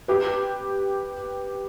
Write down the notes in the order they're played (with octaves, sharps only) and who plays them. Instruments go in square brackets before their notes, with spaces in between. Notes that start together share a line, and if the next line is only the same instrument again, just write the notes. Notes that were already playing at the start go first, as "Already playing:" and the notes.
[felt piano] G4 B4